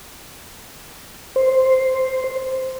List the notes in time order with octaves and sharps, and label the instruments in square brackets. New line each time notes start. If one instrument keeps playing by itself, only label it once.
[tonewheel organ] C5